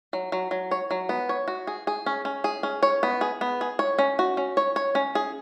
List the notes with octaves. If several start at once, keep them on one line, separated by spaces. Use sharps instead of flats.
F#3
F#3
F#3
C#5
F#3
B3
C#5
F#4
G#4
G#4
C#4
C#4
G#4
C#4
C#5
B3
G#4
B3
G#4
C#5
C#4
F#4
C#4
C#5
C#5
C#4
G#4